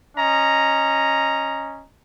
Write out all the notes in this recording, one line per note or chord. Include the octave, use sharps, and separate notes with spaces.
C#4 D#5 A#5